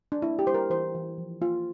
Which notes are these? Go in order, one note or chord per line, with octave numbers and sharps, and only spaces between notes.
D4
A#3 E4
G4
G3 C5
A#4
E3 C5
E3
F3
A#3 F4